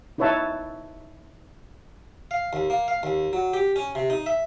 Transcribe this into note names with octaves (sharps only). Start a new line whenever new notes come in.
D#4 E4 B4 C#5 E5 A5
F5
D#2
A#3
F5
D#2
F#3
G4
C#4
C3
D#4
E5